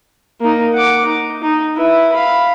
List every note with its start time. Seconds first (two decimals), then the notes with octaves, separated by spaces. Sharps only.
0.41 A#3 D#4
0.74 F#5 D6
1.05 D#4
1.42 D#4
1.76 E4 B4
2.12 F5 B5